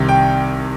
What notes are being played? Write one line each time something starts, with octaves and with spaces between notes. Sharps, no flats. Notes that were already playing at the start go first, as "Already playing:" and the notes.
Already playing: C2 C3 D#3
G5